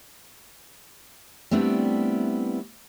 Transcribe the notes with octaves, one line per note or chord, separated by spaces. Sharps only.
G3 A3 B3 C4 D4 E4